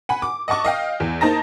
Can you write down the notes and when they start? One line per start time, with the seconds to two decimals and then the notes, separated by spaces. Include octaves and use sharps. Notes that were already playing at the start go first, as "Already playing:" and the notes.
0.09 F#5 G#5 B5
0.22 D6
0.48 D#5 F#5 A5 C#6 D6
0.64 D#5 F5 G5
1.00 E2
1.21 A#3 D#4 C5 A5 A#5 A#6